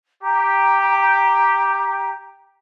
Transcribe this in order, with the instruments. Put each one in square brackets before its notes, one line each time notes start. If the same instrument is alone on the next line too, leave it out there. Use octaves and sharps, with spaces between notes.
[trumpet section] G4 [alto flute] A#5